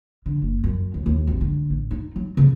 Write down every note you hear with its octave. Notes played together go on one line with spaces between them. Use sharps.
D3
F#1
F#2
D#2
D#2
G#1
D3
A1
D#4
F#3
C#3